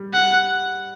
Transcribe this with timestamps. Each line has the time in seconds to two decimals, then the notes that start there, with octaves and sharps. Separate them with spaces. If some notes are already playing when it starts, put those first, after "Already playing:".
Already playing: G3
0.13 F#5